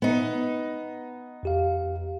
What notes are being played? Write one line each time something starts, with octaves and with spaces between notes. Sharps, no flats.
B3 D#4
F2 G4 F5